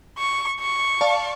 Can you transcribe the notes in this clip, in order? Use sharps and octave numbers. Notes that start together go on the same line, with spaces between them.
C#6
C#6
D5 F5 A5